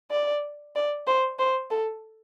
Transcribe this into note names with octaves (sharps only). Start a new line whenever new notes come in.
D5
D5
C5
C5
A4